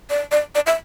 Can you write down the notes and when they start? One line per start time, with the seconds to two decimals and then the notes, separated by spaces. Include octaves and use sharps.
0.10 D5
0.32 D5
0.55 D5
0.66 E5